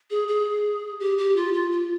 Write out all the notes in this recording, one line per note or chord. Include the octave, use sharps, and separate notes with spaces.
G#4
G#4
G4
G4
F4
F4
F4